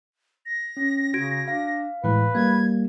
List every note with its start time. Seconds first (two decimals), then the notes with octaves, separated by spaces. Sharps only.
0.46 A#6
0.77 C#4
1.14 C#3 F#4 G#6 D7
1.48 D4 F5
2.04 A2 E3 G#3 B4
2.35 G3 A#3 G#6